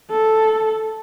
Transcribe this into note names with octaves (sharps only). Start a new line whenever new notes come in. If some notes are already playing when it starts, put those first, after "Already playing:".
A4